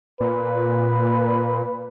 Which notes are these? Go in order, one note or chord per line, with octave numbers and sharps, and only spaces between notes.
A#2 B4